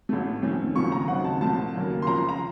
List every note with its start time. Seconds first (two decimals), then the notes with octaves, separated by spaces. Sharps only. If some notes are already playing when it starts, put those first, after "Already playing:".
0.09 A1 A2 A3
0.42 F2 D#3 A3 C#4
0.75 D#2 C#3 F3 A3 C#6
0.92 A#5
1.08 D#2 C#3 F#3 C4 D#4 F#5
1.24 A5
1.40 C2 A#2 F3 A3 A5
1.74 D#2 C#3 F#3 A#3
2.02 C6
2.07 C#2 C#3 F3 A#5
2.29 A#5